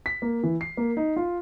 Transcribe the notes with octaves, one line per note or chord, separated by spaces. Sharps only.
B6
A#3
E3
C7
A#3
D#4
F4